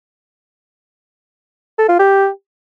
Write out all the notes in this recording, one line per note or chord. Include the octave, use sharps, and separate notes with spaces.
A4
F4
G4